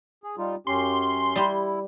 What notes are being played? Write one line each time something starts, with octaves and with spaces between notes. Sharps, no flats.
G#4
G3 D#4 F4
F#2 C#4 G4 C6
G3 E4 G4